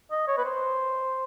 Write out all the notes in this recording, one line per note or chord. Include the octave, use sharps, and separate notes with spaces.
D#5
C#5
B4
C5